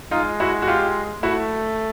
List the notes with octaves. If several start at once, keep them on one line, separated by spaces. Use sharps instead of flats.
G#3 D#4 F4
E4 F#4
F#4
F4 G4
A3 E4 F#4